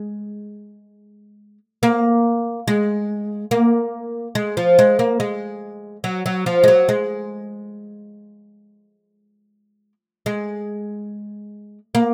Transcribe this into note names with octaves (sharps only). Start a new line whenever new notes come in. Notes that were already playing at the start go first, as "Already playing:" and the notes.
Already playing: G#3
A#3
G#3
A#3
G#3
F3
G#3
A#3
G#3
F#3
F#3
F3
G#3
F#3
G#3
G#3
A#3